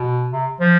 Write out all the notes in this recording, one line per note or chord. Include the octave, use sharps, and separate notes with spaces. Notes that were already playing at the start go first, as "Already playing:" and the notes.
Already playing: B2
C3
F3